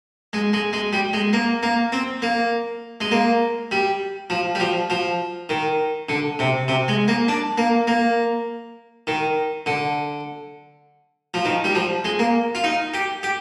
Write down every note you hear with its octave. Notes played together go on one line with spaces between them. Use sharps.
G#3
G#3
G#3
G3
G#3
A#3
A#3
C4
A#3
G#3
A#3
G3
F3
G3
F3
F3
D#3
D3
C3
C3
G#3
A#3
D4
A#3
A#3
D#3
D3
F3
D#3
G3
F3
G#3
A#3
F4
D#4
G4
G4